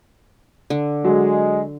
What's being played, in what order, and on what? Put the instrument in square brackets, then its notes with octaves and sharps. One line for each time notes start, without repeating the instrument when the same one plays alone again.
[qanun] D3
[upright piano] F#3 [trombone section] G#3